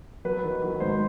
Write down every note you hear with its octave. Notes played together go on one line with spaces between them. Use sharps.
F#3 B4
D#3
F#3
G#2 C5